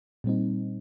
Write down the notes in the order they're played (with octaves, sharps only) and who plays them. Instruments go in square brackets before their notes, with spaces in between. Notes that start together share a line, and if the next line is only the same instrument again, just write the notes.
[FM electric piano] A#2 G3 C4 D#4